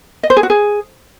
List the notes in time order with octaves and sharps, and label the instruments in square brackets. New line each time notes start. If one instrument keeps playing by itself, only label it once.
[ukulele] D#5
C5
G#4
F#4
G#4